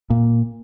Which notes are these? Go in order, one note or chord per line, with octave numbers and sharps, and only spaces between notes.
A#2